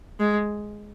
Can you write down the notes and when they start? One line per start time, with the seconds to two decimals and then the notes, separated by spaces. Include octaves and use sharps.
0.20 G#3